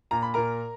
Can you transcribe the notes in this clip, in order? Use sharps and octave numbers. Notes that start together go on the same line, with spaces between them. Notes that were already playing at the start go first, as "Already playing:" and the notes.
A#2 A#5
B5
A#2 A#4 A#5